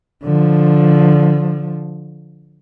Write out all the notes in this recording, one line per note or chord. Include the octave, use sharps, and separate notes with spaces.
D3 F3